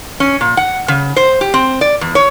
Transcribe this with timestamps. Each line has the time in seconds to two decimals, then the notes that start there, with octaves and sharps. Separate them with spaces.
0.20 C#4
0.41 A#2
0.57 F#5
0.88 C#3
1.16 C5
1.41 G4
1.54 C4
1.81 D5
2.01 E2
2.15 C#5